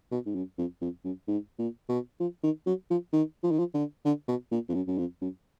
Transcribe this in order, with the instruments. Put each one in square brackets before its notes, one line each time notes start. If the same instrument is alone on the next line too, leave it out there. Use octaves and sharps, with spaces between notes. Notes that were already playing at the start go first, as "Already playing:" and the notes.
[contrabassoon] B2
G#2
F#2
F2
F2
F#2
G#2
A#2
B2
F3
D#3
F#3
F3
D#3
F3
D#3
F3
D3
D3
B2
A#2
F2
F#2
F#2
F2
F#2